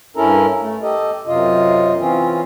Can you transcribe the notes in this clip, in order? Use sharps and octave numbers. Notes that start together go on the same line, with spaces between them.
G2 C#4 E4 A4 A#4 A#5
A3
G4 A4 D#5
F#2 C3 F4 D#5
E3 C4 C#4 F4